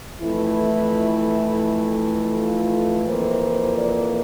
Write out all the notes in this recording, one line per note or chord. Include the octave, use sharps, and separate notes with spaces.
F2 E3 A3 E4
F4
F2 E3 A#3 C5
D5